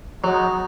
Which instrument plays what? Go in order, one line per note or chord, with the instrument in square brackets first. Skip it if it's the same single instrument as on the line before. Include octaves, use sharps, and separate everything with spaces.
[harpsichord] F#3 [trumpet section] G#3 B3 D#4 F#4